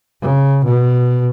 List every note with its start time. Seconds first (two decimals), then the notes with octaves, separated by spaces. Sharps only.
0.22 C#3
0.65 B2